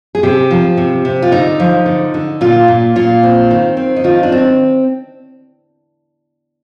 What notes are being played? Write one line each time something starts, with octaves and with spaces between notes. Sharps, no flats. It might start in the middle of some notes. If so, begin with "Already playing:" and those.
G#4
C3 G4
F3
C3
C3
F4
D3 D#4
F3
D3
D3
A#2 F4
A#2
A#2 F4
C4
D#3
C4
D#4
D#3 F4
D4
C4